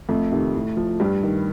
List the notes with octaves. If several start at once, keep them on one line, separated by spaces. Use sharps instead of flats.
F2 A3
C3 D#3
A2
F3
G2 G3
D#3